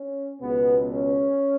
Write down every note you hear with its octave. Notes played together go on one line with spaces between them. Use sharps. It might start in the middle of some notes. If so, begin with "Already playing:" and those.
Already playing: C#4
C#2 B2 B3
C#4